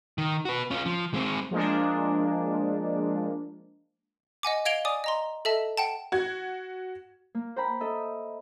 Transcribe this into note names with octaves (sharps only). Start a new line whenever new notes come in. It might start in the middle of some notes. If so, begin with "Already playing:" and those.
D#3
F#4 B4
C#4 F4
F3
G#3 C4
F3 G#3 A#3 D4
D#5 F#5 G#5 D6
D#5 F5 G#6 D7 F7 G7
D5 G#5 D6 D#6
D#5 A#5 C6
A4 D#5 E5 A5
F#5 G5 A5
F#4 G#6
A#3
C5 G5 A#5 B5
A4 D#5 E5